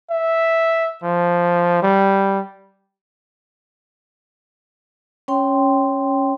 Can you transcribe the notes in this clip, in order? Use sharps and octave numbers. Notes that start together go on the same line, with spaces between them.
E5
F3
G3
C#4 C#5 G5 C6